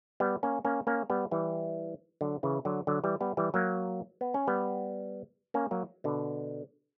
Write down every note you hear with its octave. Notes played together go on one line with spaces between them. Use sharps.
G3 B3
A#3 C#4
A#3 C#4
A#3 C#4
G3 B3
E3 G3
D3 F#3
C#3 E3
D3 F#3
D3 F#3
E3 G3
G3 B3
E3 G3
F#3 A#3
B3
C#4
G3 B3
A#3 C#4
F#3 A#3
B2 D3